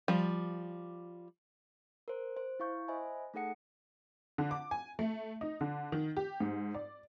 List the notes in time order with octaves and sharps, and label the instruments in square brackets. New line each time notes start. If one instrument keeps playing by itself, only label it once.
[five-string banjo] F3 G3
[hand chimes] A#4 C5
C5
E4 F5 C#6 G6
C5 D#5 E5 G#5 B5
A3 D#4 G#4 A4 F#5 C#7
[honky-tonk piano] D3
D6
G#5
A3
D#4
D3
D#3
G4
G#2
D5